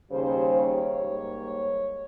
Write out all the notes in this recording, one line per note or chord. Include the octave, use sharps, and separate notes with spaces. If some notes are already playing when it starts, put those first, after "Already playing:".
D#2 C#3 G3 C5
C#5
G#2 G3 A#3